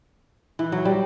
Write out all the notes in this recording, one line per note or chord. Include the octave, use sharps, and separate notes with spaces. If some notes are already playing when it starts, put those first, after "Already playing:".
E3
F#3
G3